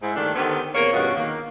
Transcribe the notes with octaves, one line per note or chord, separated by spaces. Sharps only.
G#2 E4
G2 D#3 A3 A#3 D4
D3 D#3 B3 G4 A4 C5
E2 C3 A#3 A#4 C#5
E2 G2 B2 C#4 F4 F#4
D#3 A#3